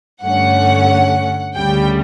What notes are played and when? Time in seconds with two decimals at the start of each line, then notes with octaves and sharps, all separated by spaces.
0.22 G2 D3 A3 C#4 F#5
1.55 D2 C#3 G3 G5